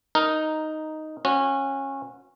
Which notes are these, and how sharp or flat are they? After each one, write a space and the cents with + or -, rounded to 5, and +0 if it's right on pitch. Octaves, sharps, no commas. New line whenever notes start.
D#4 +0 A#4 +0
C#4 -25 F#4 -25